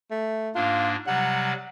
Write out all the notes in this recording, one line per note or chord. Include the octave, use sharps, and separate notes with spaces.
A3
G#2 A#3 D4 F4
C3 F#3 G3 F#5